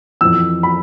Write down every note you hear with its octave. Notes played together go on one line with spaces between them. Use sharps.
F2 E3 E6
B5